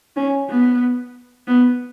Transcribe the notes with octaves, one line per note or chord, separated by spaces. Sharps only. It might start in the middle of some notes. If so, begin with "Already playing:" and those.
C#4
B3
B3